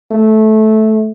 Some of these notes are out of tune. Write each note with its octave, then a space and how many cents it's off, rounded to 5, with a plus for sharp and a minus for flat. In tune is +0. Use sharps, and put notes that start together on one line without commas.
A3 -15